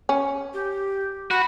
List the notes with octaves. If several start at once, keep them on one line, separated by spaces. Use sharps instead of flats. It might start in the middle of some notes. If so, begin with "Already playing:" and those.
C#4
G4
F#4 B5